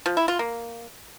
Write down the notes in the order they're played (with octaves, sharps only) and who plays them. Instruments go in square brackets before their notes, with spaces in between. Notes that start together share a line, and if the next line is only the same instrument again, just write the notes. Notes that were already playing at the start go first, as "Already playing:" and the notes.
[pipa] F3
E4
F4
A#3